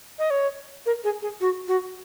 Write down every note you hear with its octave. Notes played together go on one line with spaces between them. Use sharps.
D#5
C#5
A#4
G#4
G#4
F#4
F#4